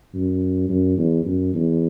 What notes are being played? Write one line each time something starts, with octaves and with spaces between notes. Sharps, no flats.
F#2
F#2
E2
F#2
E2